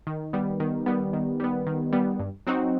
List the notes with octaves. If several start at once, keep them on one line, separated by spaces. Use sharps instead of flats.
D#3
G3 B3
D#3
G3 B3
D#3
G3 B3
D#3
G3 B3
G2
F#3 C4 D#4 F#4